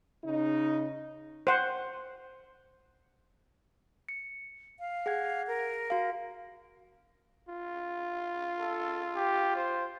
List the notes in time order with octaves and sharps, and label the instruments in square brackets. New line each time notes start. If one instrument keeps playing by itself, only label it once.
[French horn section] C#3 D#4
[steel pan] C5 F#5
[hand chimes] C#7
[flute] F5
[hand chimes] G#4 F#5 G#6
[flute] A#4
[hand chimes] F#4 F5
[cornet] F4
[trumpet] A4
G4
C5